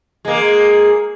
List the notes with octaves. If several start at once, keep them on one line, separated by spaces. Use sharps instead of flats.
G#3 A#3